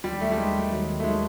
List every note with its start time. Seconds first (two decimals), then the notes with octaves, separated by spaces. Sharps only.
0.04 D#2 D#3 F#3 G3
0.21 A3
0.32 G3
0.37 D#2 D#3 F#3 G#3
0.70 D#2 D#3 F#3
1.00 A3
1.04 D#3 F#3 G#3